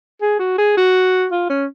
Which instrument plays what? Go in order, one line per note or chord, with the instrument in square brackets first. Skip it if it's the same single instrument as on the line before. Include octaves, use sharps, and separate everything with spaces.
[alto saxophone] G#4
F#4
G#4
F#4
F4
C#4